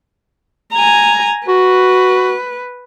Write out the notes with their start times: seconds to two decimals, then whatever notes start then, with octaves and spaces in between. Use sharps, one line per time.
0.74 G#5 A#5
1.48 F#4 B4